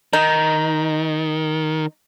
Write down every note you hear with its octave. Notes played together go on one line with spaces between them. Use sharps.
D#3 D#4